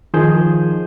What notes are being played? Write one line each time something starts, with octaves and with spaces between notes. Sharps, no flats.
D#3 F3 G#4 C5 G6